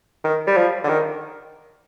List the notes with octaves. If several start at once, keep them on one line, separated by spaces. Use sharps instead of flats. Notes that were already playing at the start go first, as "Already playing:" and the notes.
D#3
G3
F3
D3
D#3